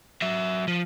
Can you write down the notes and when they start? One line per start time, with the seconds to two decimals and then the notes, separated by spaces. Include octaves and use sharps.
0.22 F#3 E5
0.68 F3